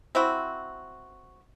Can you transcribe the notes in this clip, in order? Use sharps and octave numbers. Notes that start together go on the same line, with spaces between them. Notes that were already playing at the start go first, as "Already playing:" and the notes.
C4 E4 F#4